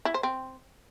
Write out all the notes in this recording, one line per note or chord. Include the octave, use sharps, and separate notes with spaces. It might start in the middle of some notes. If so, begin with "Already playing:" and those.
E4
C5
C4